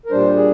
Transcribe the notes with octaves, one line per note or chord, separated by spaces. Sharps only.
A#4
A#2 G3 D4 C5
G#4